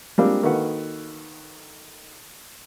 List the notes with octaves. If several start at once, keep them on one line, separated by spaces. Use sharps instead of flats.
G3 G#3 A#3 C4 D4 F4
D#3 A#3 F#4 A4 B4 F#5